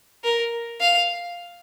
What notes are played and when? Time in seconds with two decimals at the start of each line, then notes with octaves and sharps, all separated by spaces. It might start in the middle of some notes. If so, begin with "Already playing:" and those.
0.24 A#4
0.80 F5